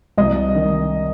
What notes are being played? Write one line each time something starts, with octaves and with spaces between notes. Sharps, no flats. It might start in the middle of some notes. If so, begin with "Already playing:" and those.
C2 D#5
D#3